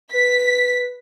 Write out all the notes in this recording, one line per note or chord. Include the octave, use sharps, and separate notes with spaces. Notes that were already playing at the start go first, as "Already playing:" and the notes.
B4 B6